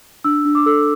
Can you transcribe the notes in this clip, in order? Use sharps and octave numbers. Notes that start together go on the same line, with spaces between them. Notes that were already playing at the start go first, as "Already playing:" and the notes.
D4 E6
D4
D6
A4 E6